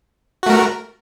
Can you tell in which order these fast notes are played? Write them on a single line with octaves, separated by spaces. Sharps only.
F#4 A3 A#4